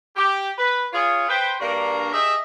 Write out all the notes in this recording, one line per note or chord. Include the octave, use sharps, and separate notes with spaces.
G4
B4
F4 G#4 C#5
B4 C5 G5
G2 A#3 D4 F#4 A#4 A#5
G4 G#4 D#5 E5